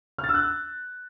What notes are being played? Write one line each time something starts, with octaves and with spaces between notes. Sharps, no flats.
F6
A6
E6
F#6
E6